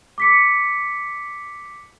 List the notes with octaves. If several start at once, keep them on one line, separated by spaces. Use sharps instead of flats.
D6 B6 C#7